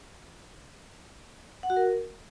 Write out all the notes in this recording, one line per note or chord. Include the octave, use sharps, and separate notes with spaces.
F#5
F#4
A#4